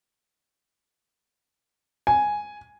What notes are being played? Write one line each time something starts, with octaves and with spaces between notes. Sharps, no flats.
G#5